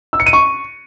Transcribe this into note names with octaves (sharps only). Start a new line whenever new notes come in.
E6
C#7
D#7
C#6